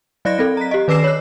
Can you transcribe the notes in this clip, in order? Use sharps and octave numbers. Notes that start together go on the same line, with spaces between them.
F#3 D5 D#5 F#6 A#6
C4 A4
A#5 B6
G4 D#5
D#3 B4 D6 E6 C7 E7
C#5 F#6